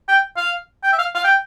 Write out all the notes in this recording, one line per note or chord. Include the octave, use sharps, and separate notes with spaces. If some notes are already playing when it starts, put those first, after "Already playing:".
G5
F5
G5
E5
F5
F5
G5